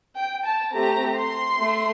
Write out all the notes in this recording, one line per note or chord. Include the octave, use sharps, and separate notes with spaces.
G5
A5
A3 C4 G4 A#5
C6
A3